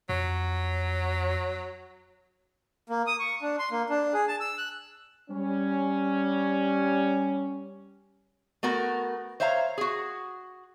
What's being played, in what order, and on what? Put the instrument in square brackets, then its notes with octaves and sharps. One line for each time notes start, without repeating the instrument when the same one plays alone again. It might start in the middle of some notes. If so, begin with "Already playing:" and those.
[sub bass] F2 [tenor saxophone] F#3
[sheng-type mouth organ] A#3
D#6
C#6
D4
C6
A#3
D4
G#4
A5
E6
F#6
[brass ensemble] G3 C#4
[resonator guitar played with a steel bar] A3 B3 F#4 A#4
C5 C#5 E5 F5 A#5
F#4 G#4